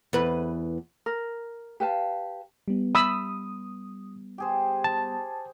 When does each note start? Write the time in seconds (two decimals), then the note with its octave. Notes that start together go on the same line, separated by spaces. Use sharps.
0.13 E2 B4
1.06 A#4
1.80 G4 B4 F5 A5
2.68 G3 B3
2.95 B5 D#6 E6
4.38 G4 G#4 C5
4.84 A5